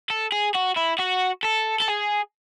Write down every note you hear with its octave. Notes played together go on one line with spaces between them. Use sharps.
A4
G#4
F#4
E4
F#4
A4
A4
G#4